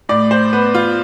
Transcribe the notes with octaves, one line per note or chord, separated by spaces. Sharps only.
A2 D5
C5
B3 B4
F4